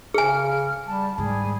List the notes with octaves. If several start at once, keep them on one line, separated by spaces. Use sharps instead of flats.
C#3 G#4 G#5 F6
G3 A5
G#2 D#3 G3 G#4